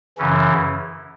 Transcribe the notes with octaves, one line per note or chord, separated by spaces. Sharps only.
F#2 C#3 E3 C#4